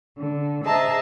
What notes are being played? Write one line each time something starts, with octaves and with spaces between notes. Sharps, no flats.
D3
G#4 C5 D#5 E5 A5 A#5